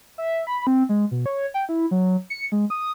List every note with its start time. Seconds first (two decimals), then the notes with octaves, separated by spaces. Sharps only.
0.18 E5
0.47 B5
0.67 C4
0.89 G#3
1.11 B2
1.26 C#5
1.54 G5
1.69 E4
1.91 F#3
2.30 C#7
2.52 G#3
2.70 D#6